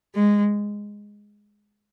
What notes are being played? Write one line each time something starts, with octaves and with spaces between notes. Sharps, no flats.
G#3